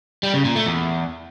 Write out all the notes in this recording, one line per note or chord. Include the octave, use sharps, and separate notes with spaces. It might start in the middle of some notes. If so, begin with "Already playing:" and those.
G3
C#3
A#2
A3
E2